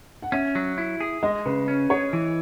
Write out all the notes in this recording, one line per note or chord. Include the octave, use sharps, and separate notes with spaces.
F#5
C#4 E5
F#3
E4
G#4
G#3 D#5
C#3 B4
C#4
G#4 C#5
E3